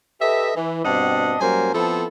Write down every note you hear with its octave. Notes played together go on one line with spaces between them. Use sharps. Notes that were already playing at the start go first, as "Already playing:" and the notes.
G4 A4 B4 D#5 E5
E3
G2 B2 C4 D4 D#5 F#5
F#2 F#3 G3 A#3 C5 G#5
F3 B3 C4 E4 A4